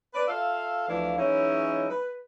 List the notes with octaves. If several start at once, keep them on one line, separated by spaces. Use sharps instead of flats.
B4 D5
F4 A4 E5 F5
D2 E3 F3 D4 E4 F5
E3 F#3 G#3 C#4 D#4 E4
B4